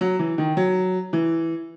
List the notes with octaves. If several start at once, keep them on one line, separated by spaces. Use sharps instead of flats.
F#3
E3
D#3
F#3
E3